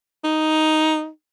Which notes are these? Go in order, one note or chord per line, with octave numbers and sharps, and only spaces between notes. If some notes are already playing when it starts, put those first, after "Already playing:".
D#4